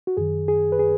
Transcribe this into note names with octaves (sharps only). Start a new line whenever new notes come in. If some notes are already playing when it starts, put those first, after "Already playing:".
F#4
F#2 D#3 G#4
G#4
B4
G#4